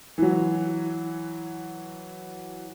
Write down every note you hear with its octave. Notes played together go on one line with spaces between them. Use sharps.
E3 F#3